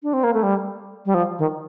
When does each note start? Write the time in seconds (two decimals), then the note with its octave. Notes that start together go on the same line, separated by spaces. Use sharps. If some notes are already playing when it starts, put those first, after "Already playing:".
0.03 D4
0.13 C4
0.24 A#3
0.34 A3
0.43 G3
1.06 G3
1.14 F3
1.39 D#3